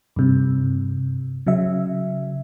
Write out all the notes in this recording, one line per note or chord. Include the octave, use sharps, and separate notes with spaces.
G2 C3
C#3 F#3 E5